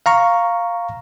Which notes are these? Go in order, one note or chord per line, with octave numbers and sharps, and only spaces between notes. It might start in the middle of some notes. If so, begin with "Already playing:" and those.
F5 A#5 C#6